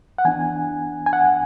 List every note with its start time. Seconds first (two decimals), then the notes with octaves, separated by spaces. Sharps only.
0.18 F#5
0.25 E3 B3 D4 G#5
1.06 G#5
1.13 F#5